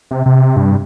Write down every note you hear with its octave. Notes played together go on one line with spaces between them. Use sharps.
C3
C3
G2